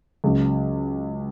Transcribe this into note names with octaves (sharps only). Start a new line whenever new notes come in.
C#2 C#3 F#3